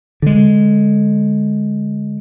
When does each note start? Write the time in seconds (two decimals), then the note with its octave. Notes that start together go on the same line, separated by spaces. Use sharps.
0.22 D3 G#3